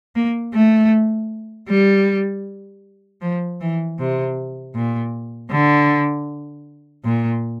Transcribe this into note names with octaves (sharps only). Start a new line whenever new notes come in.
A#3
A3
G3
F3
E3
C3
A#2
D3
A#2